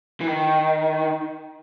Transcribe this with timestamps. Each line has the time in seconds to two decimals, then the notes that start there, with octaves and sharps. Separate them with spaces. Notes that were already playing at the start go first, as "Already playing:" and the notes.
0.21 E3
0.27 D#3